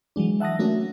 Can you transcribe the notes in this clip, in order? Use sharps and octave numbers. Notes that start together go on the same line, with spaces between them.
E3 F#3 G#3 D4
E5 F#5 A5 D#6 A#6
A3 A#3 C#4 D4 F#4